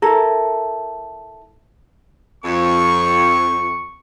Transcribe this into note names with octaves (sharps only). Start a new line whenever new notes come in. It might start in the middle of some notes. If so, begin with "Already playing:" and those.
E4 A4 A#4
F2 C#6